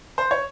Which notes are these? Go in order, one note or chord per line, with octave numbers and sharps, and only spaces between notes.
C5
C#5